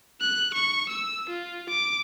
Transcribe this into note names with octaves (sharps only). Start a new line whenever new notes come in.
F#6
C#6
E6
F4
D6